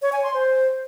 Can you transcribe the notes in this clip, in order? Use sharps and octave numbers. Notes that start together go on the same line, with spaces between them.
C#5
G#5
C6
C5